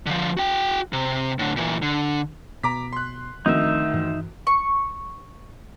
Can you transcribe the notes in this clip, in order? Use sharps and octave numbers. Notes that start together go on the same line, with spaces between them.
D3 F3
F#4 G5
C3
A2 D3
A#2 E3
D3
B2 A#5 D6 B6
C6 F#6
D2 D#3 F3 C4 D4 D#4 E5
G2 E3
C#6